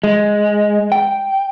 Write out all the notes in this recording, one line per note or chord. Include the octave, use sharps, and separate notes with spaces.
G#3
G5